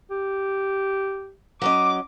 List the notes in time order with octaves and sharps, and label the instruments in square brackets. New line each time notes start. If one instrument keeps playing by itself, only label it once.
[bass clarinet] G4
[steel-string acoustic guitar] F#3 C#4 D#5 [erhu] D6